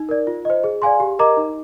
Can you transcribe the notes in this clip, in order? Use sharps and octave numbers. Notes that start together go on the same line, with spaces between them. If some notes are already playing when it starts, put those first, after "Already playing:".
Already playing: D#4
A#4 D5
F4
C5 D#5
G#4
D5 F5 G#5 C6
G4
A#4 D#5 A#5 D6
D#4